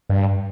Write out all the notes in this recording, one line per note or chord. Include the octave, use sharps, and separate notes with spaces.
G2